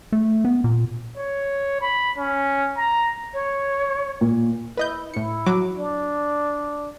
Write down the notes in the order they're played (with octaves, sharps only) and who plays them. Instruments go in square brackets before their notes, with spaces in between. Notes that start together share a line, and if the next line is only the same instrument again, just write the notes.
[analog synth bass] A3
B3
A#2
[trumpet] C#5
B5
C#4
A#5
[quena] C#5
[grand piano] A#2
[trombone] E4 [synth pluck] B4 D#5 G6
[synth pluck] A2 C#7 [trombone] E4
[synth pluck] F#3 F#4 D6
[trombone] D4